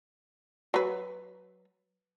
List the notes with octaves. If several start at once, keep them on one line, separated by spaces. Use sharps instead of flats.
F#3 B4